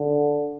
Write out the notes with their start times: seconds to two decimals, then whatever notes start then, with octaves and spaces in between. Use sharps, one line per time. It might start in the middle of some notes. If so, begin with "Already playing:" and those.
Already playing: D3